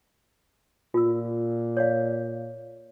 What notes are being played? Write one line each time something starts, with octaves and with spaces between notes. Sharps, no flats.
A#2 F4 E6
C#5 D5 F5